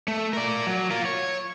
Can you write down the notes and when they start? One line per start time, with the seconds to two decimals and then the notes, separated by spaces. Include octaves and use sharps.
0.08 A3
0.33 A#4 D5
0.67 F#3
0.90 F4 A#4
1.05 C#5